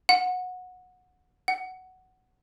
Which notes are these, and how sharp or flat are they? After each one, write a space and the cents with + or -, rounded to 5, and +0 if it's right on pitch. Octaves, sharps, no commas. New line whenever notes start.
F#5 -20
F#5 +10